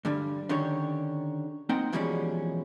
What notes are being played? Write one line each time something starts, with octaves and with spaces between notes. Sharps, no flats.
G2 D3 G3
D3 D#3 C#4 G4 C#5
A#3 C4 D#4 F#5 G5
E2 B2 F3 G3 G#3 C#4